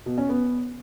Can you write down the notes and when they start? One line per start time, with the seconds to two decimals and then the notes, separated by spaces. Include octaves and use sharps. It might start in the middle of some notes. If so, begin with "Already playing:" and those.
0.06 B2
0.18 C#4
0.29 B3